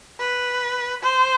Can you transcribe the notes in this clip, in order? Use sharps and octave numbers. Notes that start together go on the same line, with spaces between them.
B4
C5